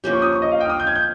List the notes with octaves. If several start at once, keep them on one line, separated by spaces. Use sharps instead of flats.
F3 A#3 C#4 G4
C#6
D#6
C#6
D#5
F5
G5
F6
D#6
G6
G#6
G6